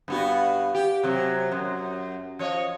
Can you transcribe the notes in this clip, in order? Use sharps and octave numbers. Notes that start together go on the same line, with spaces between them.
G2 B3 F#4
G4
C3 F#3
F#2
F3 C#5 D#5